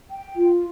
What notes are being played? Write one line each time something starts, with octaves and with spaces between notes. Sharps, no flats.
G5
F4